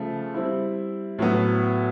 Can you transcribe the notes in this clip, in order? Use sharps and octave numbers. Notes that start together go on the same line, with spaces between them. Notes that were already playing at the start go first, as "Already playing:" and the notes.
Already playing: C#3 F3 A3
G3 C4 E4
A2 F#3 B3